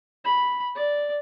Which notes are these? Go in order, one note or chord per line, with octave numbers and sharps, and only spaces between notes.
B5
D5